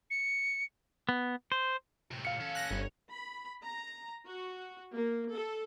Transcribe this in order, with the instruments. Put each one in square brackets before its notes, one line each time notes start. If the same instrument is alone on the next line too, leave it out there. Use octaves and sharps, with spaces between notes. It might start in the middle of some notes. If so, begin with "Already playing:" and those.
[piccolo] C#7
[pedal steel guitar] B3
C5
[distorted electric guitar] A2 C3
[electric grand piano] F5 C#7
[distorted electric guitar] C#4 A4
[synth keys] F#6 A#6
G1
[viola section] B5
A#5
F#4
A#3
A4